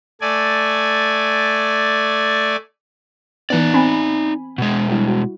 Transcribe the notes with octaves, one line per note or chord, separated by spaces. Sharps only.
A3 D5 G#5
E3 B3 D#4 D5
C4 G#5 B5
B2 G#3
G3 E4
F#4